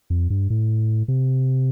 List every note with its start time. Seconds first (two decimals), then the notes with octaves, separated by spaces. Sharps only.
0.10 F2
0.30 G2
0.50 A2
1.08 C3